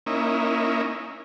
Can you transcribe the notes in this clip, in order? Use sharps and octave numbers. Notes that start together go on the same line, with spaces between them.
A#3 C#4 D#4 E4